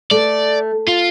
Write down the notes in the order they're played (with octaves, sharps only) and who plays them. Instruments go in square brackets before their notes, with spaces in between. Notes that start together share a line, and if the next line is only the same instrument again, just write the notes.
[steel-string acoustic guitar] A3 [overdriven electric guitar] D5
[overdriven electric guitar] F4